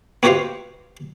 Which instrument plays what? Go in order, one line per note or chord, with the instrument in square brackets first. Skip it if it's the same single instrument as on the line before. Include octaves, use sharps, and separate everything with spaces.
[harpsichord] B3 F#4 G4 B4 C5 F5